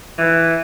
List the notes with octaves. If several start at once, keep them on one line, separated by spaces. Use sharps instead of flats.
E3